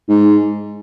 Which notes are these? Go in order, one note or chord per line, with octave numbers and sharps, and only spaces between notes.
G#2